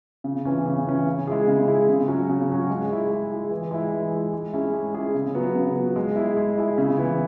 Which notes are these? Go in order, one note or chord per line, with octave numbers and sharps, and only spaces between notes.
C#3
E3 C#4
C#3
E3 C#4
C#3
G#3 E4 G#4
C#3
G#3 E4 G#4
C#3
F#3 C#4 F#4
C#3
F#3 C#4 F#4
G#3
E4 G#4
G#3
E4 G#4
E3
G#3 E4
E3
G#3 E4
G#3
C#4 E4 G#4
G#3
C#4 E4 G#4
C#3
F#3 B3
C#3
F#3 B3
G#3
E4 G#4
G#3
E4 G#4
C#3
E3 B3 E4